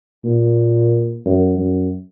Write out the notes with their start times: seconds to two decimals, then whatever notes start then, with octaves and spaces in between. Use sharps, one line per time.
0.25 A#2
1.25 F#2
1.58 F#2